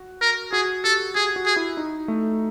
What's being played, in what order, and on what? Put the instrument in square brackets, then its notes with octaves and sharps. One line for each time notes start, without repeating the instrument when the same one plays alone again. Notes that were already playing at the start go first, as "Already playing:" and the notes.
Already playing: [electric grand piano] F#4
[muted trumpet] A#4
[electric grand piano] F#4 [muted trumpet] G#4
[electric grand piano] G4 [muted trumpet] A4
[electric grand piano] G4 [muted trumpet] G#4
[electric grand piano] F#4
[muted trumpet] G#4
[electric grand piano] E4
D#4
A3